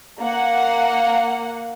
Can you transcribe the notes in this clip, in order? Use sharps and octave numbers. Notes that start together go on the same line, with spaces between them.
A#3 F#5